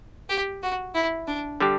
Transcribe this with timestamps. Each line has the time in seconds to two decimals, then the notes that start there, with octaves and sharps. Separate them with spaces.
0.29 G4
0.63 F#4
0.95 E4
1.27 D4
1.60 D3 G3 D4 G4